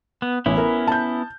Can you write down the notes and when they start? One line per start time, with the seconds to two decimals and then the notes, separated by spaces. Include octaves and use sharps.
0.22 B3
0.46 A1 B3 C#4 E4
0.58 A#4
0.87 A5 G6